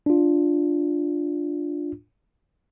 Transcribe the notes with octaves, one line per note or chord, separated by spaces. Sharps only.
D4 F4